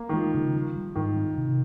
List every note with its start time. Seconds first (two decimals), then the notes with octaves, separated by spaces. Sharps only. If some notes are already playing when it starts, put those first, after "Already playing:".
Already playing: A#3
0.09 D#3
0.13 F3 G#3
0.34 C#3
0.54 G3
0.76 G3
0.95 G#2 D#3
1.17 C4
1.37 C3